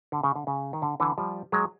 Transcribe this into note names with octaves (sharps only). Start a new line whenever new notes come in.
D3
C#3
D3
C#3
D#3
D3
D3 E3
F3 G3
F#3 G#3